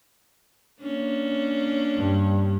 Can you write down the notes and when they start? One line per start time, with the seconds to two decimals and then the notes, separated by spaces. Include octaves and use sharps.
0.81 A#3 C#4 D4
1.96 G2